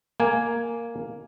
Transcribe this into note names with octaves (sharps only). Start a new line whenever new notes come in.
A#3 G#5